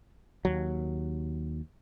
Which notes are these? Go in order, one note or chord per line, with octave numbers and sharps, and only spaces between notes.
D#2 F#3